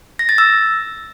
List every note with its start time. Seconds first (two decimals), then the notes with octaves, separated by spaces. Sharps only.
0.19 A#6
0.29 A6
0.38 E6